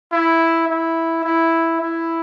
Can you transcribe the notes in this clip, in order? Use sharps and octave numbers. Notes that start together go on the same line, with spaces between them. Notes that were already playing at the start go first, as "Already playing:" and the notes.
E4
E4
E4
E4